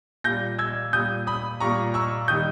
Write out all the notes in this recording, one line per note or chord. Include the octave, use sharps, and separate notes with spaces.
A#2 G3 G6 A#6
E6 G#6
A#2 G3 D#6 G6
B5 D#6
A#2 G3 A#5 C#6
C#6 E6
D#3 G3 D#6 G6